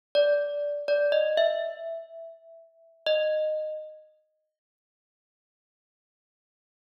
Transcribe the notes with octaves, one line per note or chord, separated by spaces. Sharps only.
D5
D5
D#5
E5
D#5